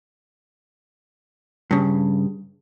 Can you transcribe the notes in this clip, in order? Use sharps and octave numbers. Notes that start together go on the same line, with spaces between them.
G2 C#3